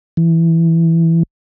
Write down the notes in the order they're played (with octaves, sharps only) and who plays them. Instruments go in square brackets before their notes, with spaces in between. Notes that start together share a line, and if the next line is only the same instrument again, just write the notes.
[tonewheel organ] E3